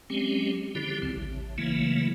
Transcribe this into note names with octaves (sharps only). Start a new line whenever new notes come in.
F#3 G#3 C4 C#4 G4
D3 F3 G3 E4 G4
D2 C#3 C4
A1
C#3 E3 F#3 A3 A#3 E4